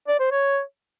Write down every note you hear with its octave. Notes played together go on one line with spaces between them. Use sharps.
D5
C5
C#5